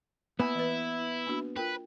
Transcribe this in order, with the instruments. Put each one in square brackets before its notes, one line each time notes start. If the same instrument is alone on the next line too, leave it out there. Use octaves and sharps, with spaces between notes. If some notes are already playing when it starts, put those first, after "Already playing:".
[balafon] A#3 G#5 B5 [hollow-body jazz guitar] B3 [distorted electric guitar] E4
[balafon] E3 B4
A#3 D4 F#4
[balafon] F4 A#4 G5 [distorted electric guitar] B4